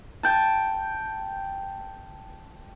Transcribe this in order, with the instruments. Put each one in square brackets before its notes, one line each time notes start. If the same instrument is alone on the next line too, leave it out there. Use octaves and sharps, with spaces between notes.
[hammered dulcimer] G5 A5